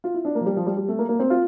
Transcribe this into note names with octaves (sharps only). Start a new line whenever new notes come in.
F4
E4
D4
A#3
F3
G3
F3
G3
G3
A3
A#3
A#3
C4
F4